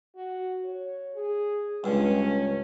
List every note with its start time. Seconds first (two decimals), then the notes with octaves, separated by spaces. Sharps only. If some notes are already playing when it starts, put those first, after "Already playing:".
0.15 F#4
0.65 C#5
1.15 G#4
1.84 C#2 G2 C#4